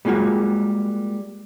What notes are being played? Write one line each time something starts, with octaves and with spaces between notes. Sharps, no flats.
G3 G#3 A#3 F4 F#4